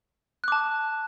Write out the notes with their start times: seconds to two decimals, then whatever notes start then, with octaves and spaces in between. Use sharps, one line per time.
0.44 F#6
0.48 D6
0.52 A5